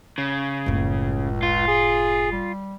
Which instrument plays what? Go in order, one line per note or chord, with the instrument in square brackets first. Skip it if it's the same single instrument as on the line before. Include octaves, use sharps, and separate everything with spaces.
[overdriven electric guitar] C#3
[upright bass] F#1 A2 [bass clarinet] C#2
[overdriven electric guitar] F4
[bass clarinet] G#4
G3